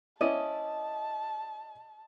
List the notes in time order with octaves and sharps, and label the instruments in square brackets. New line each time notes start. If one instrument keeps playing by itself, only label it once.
[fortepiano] C#4 E4 D5 [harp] D#5 [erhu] A5